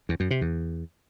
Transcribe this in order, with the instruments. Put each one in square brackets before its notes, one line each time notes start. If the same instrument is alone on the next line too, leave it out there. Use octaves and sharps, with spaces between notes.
[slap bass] E2
F#2
C3
E2